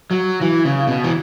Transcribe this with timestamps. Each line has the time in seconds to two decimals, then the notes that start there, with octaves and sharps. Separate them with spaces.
0.11 F#3
0.41 E3
0.65 C#3
0.87 B2
1.04 E3